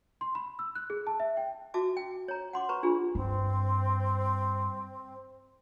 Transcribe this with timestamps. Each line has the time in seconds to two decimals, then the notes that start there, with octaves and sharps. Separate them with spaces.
0.21 C6
0.35 B5
0.59 E6
0.75 F#6
0.90 G#4
1.07 A5
1.20 E5
1.37 G5
1.74 F#4 E5 A5 D6
1.97 G5
2.28 C#5 A#5
2.53 F#5 C6 D6
2.69 B4 A#5 C#6
2.83 D4 F4 G4 G#4
3.15 G2 C4